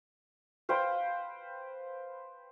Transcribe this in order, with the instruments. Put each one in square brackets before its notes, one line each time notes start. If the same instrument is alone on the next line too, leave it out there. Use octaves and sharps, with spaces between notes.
[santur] B4 C5 F5 G5